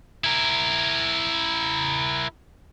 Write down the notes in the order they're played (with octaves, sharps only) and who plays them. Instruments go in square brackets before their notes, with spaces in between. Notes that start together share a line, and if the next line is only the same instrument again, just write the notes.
[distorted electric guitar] E4 A#4